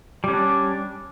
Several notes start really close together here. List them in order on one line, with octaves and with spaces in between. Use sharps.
G3 C#4 D4